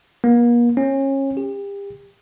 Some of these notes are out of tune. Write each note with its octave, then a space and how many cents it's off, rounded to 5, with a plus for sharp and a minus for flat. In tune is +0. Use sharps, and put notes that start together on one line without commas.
A#3 +40
C#4 -30
G4 +35